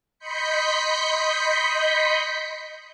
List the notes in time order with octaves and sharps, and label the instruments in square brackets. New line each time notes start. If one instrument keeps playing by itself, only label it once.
[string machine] D#5 B5 C6 G6 B6 C#7